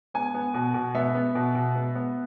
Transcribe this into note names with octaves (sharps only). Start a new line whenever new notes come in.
B3 G#5
B3
B2
B2
B3 E5
B3
B2
B2
B3
B3